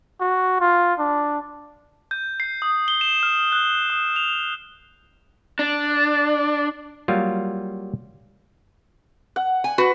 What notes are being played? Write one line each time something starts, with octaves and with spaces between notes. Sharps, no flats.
F#4
F4
D4
G6
C7
D#6
G7
E7
F6
F#6
D#6
F7
D4
F#3 G3 A#3 F4
F#5
G#5
F#4 B4